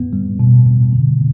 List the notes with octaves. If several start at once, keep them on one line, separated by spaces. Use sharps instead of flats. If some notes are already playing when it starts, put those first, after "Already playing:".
Already playing: B3
G3
B2
B2
D3